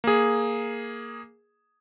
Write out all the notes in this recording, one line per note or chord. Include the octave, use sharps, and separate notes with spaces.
A#3 G#4